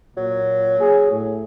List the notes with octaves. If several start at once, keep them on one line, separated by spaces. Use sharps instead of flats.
A#2 F#3
G#4
A2